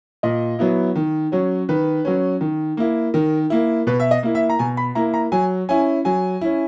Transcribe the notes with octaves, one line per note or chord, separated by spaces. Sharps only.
A#2 D#5
F#3 B3 E4
D#3
F#3 C#4
D#3 B4
F#3 C#4
D#3
A#3 E4
D#3 A#4
A#3 E4
B2 B4
E5
D#5
A#3 E4
E5
A#5
B2 G#5
B5
A#3 E4 A#5
A#5
F#3 G#5
C#4 E4 G#5
F#3 G#5
C#4 E4